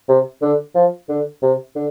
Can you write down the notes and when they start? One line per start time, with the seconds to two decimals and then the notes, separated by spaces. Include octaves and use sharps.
0.09 C3
0.42 D3
0.75 F3
1.09 D3
1.42 C3
1.76 D3